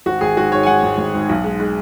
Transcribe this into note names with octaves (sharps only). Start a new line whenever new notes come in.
G#1 F#4
G#1 G#4
G#2 F#4
G#2 C#5
G#5
G#2 F#5
G#1
G#1
G#2
B1
G#3
G#3